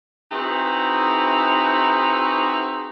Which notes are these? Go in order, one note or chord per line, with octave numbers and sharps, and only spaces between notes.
C4 D#4 E4 F#4 G#4 B4